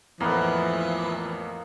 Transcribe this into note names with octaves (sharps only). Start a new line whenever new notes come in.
A1 F2 E3 F3 A#3 B3